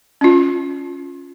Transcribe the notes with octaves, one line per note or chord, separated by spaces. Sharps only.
C#4 F4